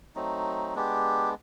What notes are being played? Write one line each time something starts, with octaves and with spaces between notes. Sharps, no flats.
F#3 A3 C4 D#4
G#3 B3 D4 G4